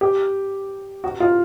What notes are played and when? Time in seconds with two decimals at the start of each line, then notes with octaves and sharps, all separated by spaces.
0.01 G4
1.04 F#4
1.20 F4